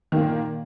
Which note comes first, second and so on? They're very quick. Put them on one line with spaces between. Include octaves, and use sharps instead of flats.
D#3 A#3 A#2